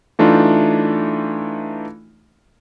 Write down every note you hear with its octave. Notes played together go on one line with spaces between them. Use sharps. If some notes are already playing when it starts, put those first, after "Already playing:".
E3 A3 D4 D#4 F4